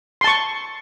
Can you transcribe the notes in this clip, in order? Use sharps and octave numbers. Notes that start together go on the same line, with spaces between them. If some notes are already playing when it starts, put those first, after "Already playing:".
A5 C6 C#6